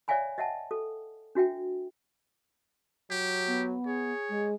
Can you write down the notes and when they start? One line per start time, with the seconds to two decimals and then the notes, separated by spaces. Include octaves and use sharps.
0.08 C#5 D5 E5 F5 G#5 B5
0.38 D#5 E5 F#5 G5 A5
0.71 A4
1.35 D4 F#4 E5 G5
3.11 F#3 G4
3.46 B3
3.87 G#4 C#5
4.29 G#3